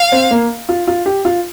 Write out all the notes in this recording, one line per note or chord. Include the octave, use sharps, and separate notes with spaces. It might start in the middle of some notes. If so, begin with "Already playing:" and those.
Already playing: F5
C4
A#3
F4
F4
G4
F4